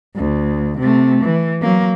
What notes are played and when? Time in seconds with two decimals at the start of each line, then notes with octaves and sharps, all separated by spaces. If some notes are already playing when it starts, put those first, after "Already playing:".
0.16 D2
0.79 C3 A3
1.24 E3
1.62 F#3 A#3